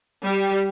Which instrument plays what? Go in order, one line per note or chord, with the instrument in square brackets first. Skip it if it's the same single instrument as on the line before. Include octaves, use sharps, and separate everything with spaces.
[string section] G3